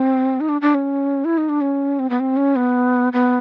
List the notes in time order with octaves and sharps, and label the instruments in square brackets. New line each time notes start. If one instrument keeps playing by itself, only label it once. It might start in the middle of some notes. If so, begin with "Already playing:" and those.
Already playing: [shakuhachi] C4
D#4
D4
D4
C#4
E4
D#4
D4
C#4
C4
B3
C4
C#4
B3
B3